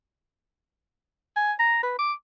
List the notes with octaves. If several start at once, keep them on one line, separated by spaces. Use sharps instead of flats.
G#5
A#5
B4
D6